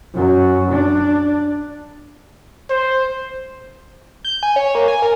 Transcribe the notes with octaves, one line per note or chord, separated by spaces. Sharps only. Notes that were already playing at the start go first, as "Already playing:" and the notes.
F#2 F#3
D4
C5
G6
G#5
C#5
A#3
G#5
A#4